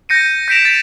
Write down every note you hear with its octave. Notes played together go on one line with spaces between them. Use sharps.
G6 A#6 C#7 D#7
G6 A#6 B6 D7 E7 F7
A6 B6 F7